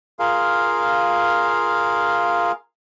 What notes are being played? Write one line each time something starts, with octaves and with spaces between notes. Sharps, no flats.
F4 G#4 A#4 F5